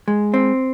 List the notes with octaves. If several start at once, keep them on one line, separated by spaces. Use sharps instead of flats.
G#3
C4